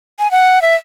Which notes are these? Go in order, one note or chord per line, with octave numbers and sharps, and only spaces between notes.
G#5
F#5
E5